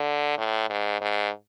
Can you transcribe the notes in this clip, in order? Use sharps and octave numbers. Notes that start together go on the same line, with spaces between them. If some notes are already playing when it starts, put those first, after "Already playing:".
Already playing: D3
A2
G#2
G#2